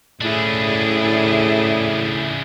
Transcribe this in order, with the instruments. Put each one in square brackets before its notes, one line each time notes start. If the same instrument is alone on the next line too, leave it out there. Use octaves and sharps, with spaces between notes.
[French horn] A2 [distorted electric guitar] C#3 D4 [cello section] E4 G#4 D5